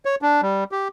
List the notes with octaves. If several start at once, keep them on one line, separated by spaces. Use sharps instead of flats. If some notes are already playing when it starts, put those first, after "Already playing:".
C#5
D4
G3
G4